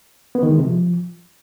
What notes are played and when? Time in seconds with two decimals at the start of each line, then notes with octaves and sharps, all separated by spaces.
0.35 B3
0.43 D#3
0.51 G#3
0.58 C3
0.66 F3